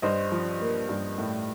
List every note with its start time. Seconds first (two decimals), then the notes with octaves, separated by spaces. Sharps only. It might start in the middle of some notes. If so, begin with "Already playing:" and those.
0.02 G2 C5 D#5
0.32 F3
0.61 A#3
0.89 G2
1.18 A2